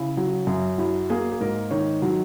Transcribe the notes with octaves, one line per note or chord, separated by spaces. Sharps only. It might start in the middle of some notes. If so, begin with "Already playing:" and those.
Already playing: C#3 E4
F#3
F#2
F#3 E4
A#3 G#4
G#4
G#2 A#4
D#3 C#5
F#3